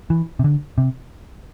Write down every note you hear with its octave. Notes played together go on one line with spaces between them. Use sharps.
E3
C3
D3
C3